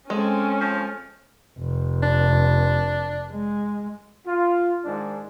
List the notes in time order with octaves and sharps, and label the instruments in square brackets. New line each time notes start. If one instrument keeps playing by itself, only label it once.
[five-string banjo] G#3 [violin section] C4 A4 G#5 [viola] C#4
[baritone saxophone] F3
[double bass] F1
[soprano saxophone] D4
[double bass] G#3
[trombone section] F4
G#2 D#3 G#3 D4